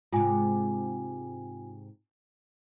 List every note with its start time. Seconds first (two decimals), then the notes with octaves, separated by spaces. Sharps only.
0.13 G#2 C3 F4 G#5